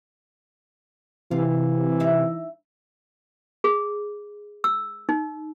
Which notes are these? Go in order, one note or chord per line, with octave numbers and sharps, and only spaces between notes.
C3 E3 F4
D#4 E4
G#4
E6
D#4